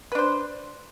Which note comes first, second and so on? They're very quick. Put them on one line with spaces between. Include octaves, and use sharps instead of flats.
B4 D4 C5